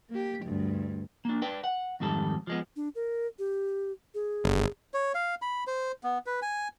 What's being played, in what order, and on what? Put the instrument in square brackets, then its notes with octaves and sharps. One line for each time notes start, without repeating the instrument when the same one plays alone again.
[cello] A#3 G4
D2 G2
[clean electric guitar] A#3 D4
B4 D5 G5
F#5
F2 G#2 D#3 G3 A4
F3 G#3 B3
[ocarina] D4
A#4
G4
G#4
[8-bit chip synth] G1
[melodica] C#5
F5
B5
C5
B3
B4
G#5